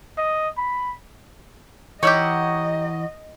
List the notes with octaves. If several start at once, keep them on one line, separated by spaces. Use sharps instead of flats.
D#5
B5
E3 D#4 G4 C#5 D#5 F#5 E6